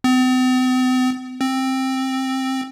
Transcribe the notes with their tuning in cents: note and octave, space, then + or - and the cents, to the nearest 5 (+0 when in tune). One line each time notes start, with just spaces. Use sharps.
C4 -45
C4 +10